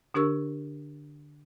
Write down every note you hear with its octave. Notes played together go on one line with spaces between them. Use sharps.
D3 D4 G4 A#4 C#6 E6